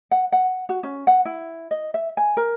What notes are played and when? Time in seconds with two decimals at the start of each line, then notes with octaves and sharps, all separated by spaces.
0.11 F#5
0.32 F#5
0.69 F#4
0.83 C#4
1.07 F#5
1.25 E4
1.71 D#5
1.94 E5
2.17 G#5
2.37 A#4